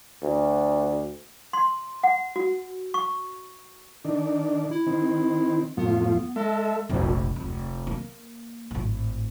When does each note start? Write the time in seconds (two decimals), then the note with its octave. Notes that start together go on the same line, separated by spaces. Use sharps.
0.23 D2
1.53 C6
2.03 F#5
2.36 F#4
2.94 C#6
4.05 D#3 D4
4.71 E4
4.86 D#3 C4
5.77 F2 A2 F3 B3
6.36 G#3 A4 E5
6.89 F1 A#1
7.36 F1 D2
7.87 A#3
8.71 G#1 A2